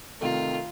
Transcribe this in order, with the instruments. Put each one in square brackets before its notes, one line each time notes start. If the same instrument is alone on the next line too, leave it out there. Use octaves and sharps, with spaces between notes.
[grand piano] C3 D#3 A3 [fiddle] F4